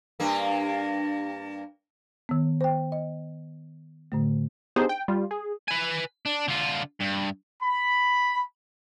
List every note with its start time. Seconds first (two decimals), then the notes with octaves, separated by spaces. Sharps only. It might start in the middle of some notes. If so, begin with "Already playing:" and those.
0.20 G2 A#3
2.29 D#3 B3
2.61 C5 G5
2.92 D#5
4.12 A2 D3 A3
4.76 B3 D4 D#4 G4 G#4 C5
4.89 G5
5.08 G3 F4
5.31 G#4
5.68 B4 G#5
6.26 D4
6.48 D3 F4
7.00 G2
7.61 B5